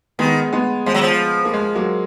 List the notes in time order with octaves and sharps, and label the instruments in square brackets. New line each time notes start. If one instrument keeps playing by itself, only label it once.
[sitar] D#3 [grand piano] G#3 B3
[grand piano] G#3 B3
[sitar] F3 [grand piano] G#3
[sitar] F#3
F3
[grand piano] A#3
G#3
F#3 A#3